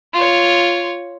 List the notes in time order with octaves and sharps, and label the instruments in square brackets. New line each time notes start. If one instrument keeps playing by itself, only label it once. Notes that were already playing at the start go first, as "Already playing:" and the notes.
[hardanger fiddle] F4 C#5